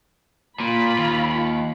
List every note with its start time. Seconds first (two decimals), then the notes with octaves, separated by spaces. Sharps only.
0.60 A#2 F4 B5
0.98 D#2